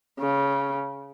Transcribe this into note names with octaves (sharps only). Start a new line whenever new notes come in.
C#3